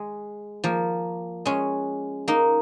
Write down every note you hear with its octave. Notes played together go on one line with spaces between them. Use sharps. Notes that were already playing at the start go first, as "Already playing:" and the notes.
Already playing: G#3
F3 A#3
G#3 C#4
A#3 D#4